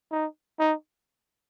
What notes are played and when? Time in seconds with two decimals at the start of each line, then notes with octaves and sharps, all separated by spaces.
0.12 D#4
0.59 D#4